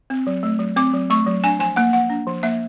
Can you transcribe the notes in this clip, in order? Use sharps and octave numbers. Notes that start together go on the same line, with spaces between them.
C4
F#3
A3
F#3
C4 D6
F#3
A3 C#6
F#3
D4 G#5
F3 G#5
A#3 F#5
F3 F#5
D4
F3
A#3 E5